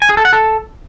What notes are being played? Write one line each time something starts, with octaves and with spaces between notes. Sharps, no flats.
G#5
G#4
A4
F#5
A4